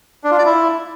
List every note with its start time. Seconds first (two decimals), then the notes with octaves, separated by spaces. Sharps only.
0.24 D4
0.31 F4
0.38 D5
0.45 E4